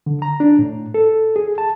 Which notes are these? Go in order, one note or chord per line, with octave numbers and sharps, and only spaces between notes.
D3
A#5
D4
A2
A4
G#4
A5